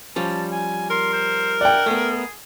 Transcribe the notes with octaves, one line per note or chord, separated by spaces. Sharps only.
F3 G3 C#4 A5
G#5
A#4 C6
C5
D5 F#5 G5
A3 B3 G#4